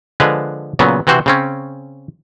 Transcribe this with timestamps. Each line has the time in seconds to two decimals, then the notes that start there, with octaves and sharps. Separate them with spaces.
0.20 D3 F3 G#3 B4
0.79 A#2 C#3 F#3 B3
1.07 C3 E3 C4 F#4 C5
1.26 C#3 C4 C#4